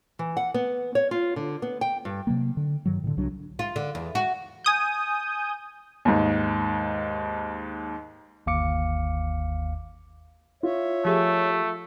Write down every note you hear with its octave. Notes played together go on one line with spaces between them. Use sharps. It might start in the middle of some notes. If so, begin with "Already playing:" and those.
E3
F#5
B3
C#5
F4
D3
B3
G5
G2
C3 F#3 A#3
D3
G2 D#3 F#3
A2 D3
C2 F#3 D4
F4
D3
E2
F#4
G#5 D#6 G6
D#2 G#2
G1 D#2 F5 D6 C#7
F4 C#5 E5
F3 A3 G4 G#4